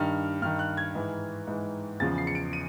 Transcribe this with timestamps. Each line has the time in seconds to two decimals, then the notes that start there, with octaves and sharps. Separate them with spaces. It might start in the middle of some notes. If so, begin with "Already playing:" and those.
Already playing: G2 D#3 F6
0.42 G2 D#3 F6
0.59 F#6
0.77 G#6
0.95 G#2 E3
1.47 G#2 E3
2.00 E2 C#3 F3 A6
2.18 C7
2.27 C#7
2.35 D7
2.53 D#7